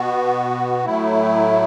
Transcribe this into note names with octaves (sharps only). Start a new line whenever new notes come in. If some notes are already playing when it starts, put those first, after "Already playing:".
Already playing: B2 B3 F#4
A2 F#3 A3 E4